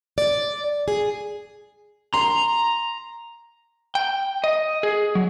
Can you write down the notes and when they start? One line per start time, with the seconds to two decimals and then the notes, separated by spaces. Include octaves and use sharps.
0.18 D5
0.88 G#4
2.14 A#5 C6
3.95 G5
4.44 D#5
4.83 G#4
5.15 F#3